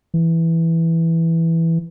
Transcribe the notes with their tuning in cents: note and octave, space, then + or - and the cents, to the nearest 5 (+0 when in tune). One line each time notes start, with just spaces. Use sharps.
E3 +0